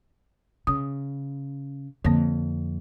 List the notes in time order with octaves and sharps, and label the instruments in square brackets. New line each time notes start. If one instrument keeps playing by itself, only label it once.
[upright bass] C#3 [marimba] D#6
[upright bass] F2 [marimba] D3 A#3